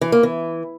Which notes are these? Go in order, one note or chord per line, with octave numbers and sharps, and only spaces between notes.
E3
A#3
E3